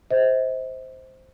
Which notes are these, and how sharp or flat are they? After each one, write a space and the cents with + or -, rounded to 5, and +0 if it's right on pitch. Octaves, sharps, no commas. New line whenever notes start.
C5 +0 D#5 +45